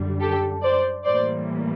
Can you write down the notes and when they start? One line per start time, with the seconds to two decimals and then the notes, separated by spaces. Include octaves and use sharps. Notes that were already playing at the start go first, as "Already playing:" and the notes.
Already playing: F#2 D3 G3
0.21 G4 A4
0.63 C5 D5
1.05 A2 E3 G3 A#3 C5 D5